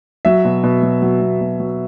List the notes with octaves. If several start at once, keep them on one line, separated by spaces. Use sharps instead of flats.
F#3 E5
B2
B2
F#3
F#3
B2
B2
F#3